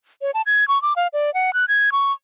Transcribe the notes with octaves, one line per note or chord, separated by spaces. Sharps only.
C#5
A5
G#6
C#6
D6
F5
D5
F#5
F#6
G#6
C#6